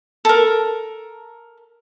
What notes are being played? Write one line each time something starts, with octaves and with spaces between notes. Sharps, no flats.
A4 A#4